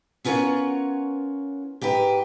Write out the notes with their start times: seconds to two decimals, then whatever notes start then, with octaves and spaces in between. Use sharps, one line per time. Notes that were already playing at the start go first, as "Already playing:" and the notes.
0.24 B3 C#4 F4 A#4 C#5 F#5
1.81 G#2 G4 A#4 B4